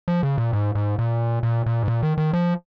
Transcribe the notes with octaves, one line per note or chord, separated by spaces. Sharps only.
F3
C#3
A#2
G#2
G#2
A#2
A#2
A#2
G#2
A#2
D#3
D#3
F3